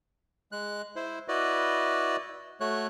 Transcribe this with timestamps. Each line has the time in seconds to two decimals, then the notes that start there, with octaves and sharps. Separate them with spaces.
0.52 G#3 F#6
0.96 E4 C5
1.28 E4 F#4 B4 D5 D#5
2.60 A3 F#4 C#5 F#6